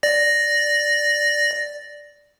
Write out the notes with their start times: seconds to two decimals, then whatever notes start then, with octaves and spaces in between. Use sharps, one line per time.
0.03 D5 A#6